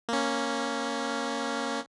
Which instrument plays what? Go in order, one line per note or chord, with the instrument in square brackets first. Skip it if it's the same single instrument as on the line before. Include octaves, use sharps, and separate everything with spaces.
[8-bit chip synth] A#3 C#4